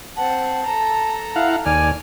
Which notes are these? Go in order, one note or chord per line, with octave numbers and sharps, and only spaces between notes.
C4 F#5 A5
A4 A#5
E4 F5 F#5
D#2 D5 G#5 F6